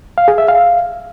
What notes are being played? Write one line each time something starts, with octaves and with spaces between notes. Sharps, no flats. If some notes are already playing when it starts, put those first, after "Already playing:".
F5
G#4
E5
F5